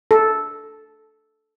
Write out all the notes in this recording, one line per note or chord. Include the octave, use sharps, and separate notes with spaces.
A4